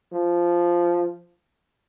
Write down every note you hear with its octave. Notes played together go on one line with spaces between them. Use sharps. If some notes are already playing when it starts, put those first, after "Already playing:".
F3